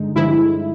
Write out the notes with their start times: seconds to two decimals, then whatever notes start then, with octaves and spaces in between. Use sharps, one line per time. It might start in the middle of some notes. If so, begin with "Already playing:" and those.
Already playing: G2 D3 G#3 D#4
0.16 G2 D3 F3 G#3 E4